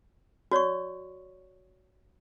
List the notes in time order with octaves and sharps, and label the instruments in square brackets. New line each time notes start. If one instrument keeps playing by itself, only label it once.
[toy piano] F#4 C#5 D5 C#6